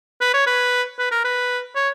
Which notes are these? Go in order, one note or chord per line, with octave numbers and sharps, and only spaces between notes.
B4
C#5
B4
B4
A#4
B4
C#5